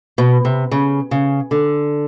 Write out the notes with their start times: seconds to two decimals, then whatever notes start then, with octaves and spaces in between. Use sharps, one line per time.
0.18 B2
0.45 C3
0.71 C#3
1.11 C#3
1.51 D3